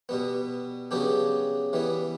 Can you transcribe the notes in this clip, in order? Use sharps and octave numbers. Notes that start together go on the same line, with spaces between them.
B2 G3 B3
C#3 F#3 B3 D4 G4
E3 G3 B3